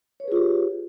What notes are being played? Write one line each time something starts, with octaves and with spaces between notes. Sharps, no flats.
F4 G4 G#4 B4 C#5